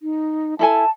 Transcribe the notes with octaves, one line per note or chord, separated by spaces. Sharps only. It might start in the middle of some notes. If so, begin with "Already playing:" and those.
D#4
E4 A4 G#5 A5